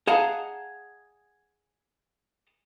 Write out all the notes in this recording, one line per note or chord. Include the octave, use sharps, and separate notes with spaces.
G#4 D#5 F5 F#5 A5 A#5